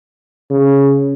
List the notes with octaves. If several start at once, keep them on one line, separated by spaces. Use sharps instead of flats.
C#3